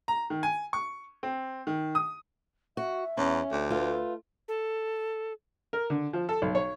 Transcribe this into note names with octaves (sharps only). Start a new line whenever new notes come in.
A#5
D#3
G#5
C#6
C4
D#3
D#6
F#4 E5
E2 C#4
D2
A3 F4 B4
A4
A#4
D3
F3
A4
B1
C#5